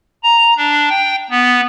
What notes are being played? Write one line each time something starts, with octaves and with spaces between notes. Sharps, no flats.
A#5
D4
G5
B3